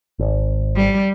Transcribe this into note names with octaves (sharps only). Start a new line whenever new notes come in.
G#1
G3